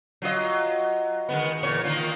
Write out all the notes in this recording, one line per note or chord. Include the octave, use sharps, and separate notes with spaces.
F#3 F4 D#5
D#3 G#3 B3
E2 A#2 C#5
D#3 A#3 F4